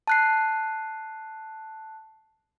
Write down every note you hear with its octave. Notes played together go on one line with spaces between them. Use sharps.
A5 F#6 C7